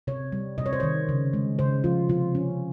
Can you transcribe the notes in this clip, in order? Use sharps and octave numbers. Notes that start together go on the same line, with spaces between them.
C3 C#5
G3
C3 D#5
C#5
C5
D#3 C#5
C#3
G#3
C#3 C5
F3 F4
C3 F4
C#4